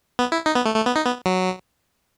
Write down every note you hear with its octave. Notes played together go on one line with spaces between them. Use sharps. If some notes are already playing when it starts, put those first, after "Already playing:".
B3
E4
D#4
B3
A3
A3
B3
D#4
B3
F#3